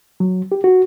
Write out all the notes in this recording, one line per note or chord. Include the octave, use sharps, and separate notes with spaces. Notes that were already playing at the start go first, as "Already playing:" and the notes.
F#3
G4
F#4